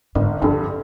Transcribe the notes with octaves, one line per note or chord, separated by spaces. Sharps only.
G1 G#2
G2 D3 F3